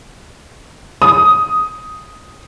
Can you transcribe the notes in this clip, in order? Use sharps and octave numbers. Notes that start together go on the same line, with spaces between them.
D#6